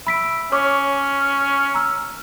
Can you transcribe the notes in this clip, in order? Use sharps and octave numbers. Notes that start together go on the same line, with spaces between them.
E5 B5 B6 D7
C#4 C#5 C#6 D6
A#5 E6 F6